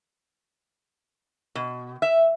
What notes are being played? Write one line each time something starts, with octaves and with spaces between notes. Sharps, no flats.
B2
E5